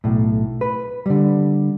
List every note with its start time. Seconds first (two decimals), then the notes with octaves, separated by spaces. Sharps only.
0.04 B1 A2
0.61 B4
1.06 D3 G3